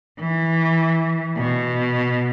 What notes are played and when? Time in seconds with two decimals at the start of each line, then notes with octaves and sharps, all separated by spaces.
0.20 E3
1.37 B2